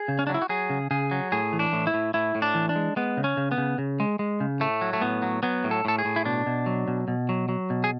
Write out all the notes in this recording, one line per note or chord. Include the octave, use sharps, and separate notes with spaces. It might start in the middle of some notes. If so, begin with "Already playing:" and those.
Already playing: G#4
C#3
C#4
F#3 D4
E4
F#4
F#3 G#4
C#3
C#3 G#4
F#3
A2 G#4
E3
D4
A2
E4
A2
A2 E4
A2
D4
E3
D4
G#3
G#3 B3
C#3
C#4
C#3
B3
C#3
C#3
G#3
G#3
C#3
A2 A3
F#3
A3
A2 B3
F#3
F#3 B3
A2
A4
A2 A4
G#4
A2
E4
B2 D4
B2
F#3
B2
B2
F#3
F#3
B2
G#4